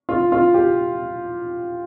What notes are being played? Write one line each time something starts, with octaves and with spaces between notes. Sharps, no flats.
F4
F4
G4